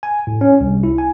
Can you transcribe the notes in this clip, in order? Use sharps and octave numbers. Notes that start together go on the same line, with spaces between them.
G#5
A2
C#4
C2
E4
G#5